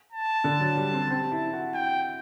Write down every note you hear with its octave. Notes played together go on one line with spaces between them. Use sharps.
A5
D3
F#3
G3
C4
C4
E4
F#4
G5